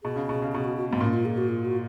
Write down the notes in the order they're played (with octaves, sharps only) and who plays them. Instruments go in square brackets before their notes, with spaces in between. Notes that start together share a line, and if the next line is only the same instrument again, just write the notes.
[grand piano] B2 [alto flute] G#4
[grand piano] C#3
B2
C#3
[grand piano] B2 [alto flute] G#4
[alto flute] F#4
F#4
[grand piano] G#2 [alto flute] B3
[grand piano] A#2 [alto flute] C#4
[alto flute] F4
G#4
F#4
F4
F#4